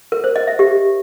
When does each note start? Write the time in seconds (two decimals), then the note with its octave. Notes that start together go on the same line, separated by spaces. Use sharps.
0.12 A#4
0.24 C5
0.36 D#5
0.47 E5
0.59 G4